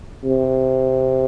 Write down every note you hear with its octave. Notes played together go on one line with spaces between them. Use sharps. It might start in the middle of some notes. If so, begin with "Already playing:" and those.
C3